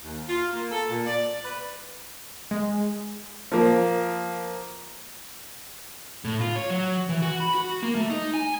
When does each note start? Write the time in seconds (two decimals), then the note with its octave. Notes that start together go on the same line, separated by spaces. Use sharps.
0.03 D#2
0.28 F4
0.53 A#3
0.71 A4
0.89 A#2
1.06 D5
1.43 B4
2.51 G#3
3.52 F3 A#3
6.25 A2
6.41 F4
6.56 C#5
6.70 F#3
7.09 E3
7.22 F#4
7.40 B5
7.55 F#4
7.83 A#3
7.95 A3
8.10 D#4
8.34 G#5